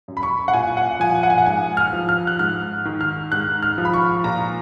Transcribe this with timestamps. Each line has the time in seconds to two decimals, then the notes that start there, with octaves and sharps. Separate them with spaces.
0.08 F#2
0.17 B5
0.23 C#6
0.48 F#5
0.53 A#2 G#5
0.77 F#5
1.00 F3 G#5
1.23 F#5
1.30 G#5
1.38 F#5
1.46 G#2 G#5
1.77 F6
1.93 F3
2.09 F6
2.27 F#6
2.39 G#2 F6
2.85 D#3
3.01 F6
3.32 G#2 F#6
3.62 F6
3.78 F3
3.85 B5
3.94 C#6
4.24 A#2 A#5